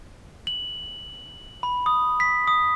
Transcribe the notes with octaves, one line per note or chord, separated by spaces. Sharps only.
F#7
B5
D#6
B6
D#6